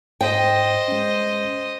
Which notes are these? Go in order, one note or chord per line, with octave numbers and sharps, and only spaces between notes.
G#2 C5 D#5 G5
G#3 C#4